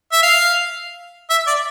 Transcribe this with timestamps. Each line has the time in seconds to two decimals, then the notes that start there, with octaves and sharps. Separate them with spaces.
0.13 E5
0.23 F5
1.30 E5
1.47 D5